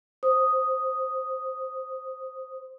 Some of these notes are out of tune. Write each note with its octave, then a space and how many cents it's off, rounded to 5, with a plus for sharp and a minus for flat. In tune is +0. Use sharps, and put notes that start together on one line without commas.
C5 +0 D#6 +0